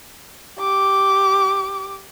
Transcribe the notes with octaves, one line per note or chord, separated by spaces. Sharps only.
G4 D6